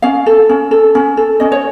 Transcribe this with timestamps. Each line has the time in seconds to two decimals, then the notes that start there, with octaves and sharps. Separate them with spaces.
0.02 C#4 F5
0.26 A4
0.49 C#4
0.71 A4
0.95 C#4
1.17 A4
1.40 C#4 D#5
1.52 C#5